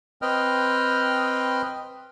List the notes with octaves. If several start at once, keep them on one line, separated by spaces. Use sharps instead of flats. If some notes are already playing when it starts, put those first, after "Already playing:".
C4 B4 D#5 G5 F6